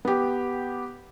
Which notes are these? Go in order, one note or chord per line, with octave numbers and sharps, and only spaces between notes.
B3 G4